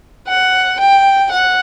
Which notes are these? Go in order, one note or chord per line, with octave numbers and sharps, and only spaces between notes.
F#5
G5
F#5